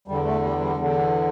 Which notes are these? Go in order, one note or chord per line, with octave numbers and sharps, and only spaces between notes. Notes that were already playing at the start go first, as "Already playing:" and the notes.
E2 D3 G3
A3
G3
G3
E2 D3